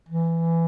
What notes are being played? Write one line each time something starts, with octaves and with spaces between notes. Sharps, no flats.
E3